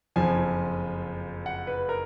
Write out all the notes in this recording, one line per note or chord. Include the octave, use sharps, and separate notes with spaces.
F#1 F2 F3 G#5
F#5
B4
A#4